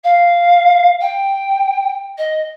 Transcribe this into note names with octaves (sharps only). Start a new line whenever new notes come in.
F5
G5
D#5